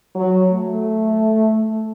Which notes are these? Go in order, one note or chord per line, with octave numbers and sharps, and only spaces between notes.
F#3
A3